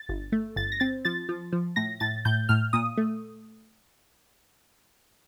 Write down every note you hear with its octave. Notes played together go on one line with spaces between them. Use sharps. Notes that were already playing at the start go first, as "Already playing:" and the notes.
Already playing: A6
G1
A3
G1 A6
A#6
C4 A6
F3 A6
F3
F3
A2 A#6
A2 A6
A2 G6
A2 F6
A#2 D#6
A3